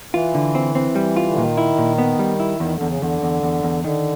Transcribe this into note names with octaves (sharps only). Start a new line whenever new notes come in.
E3 F4
D3
C4
C4
G3
F4
D3
A#2 D#3
E4
A#2
B3
G3
E4
E2 D#3
D3
E2
C#3
E2 D3
E2
E2
E2
D3 D#3